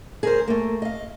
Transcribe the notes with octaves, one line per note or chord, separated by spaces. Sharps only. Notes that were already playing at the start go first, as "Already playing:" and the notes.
G#4 A#4 C5
A3 A#3
D#5 F5